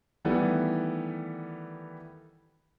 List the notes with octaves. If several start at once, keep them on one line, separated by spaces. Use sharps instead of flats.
D#3 E3 G3 A3 B3